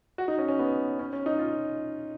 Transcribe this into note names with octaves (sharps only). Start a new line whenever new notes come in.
F#4
D#4
C#4
C#4
B3
C#4
C#4
D#4
F4